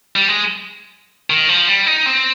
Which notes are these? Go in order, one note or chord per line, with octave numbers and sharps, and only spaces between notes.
G3
G#3
D#3
F3
G3
D#4
C4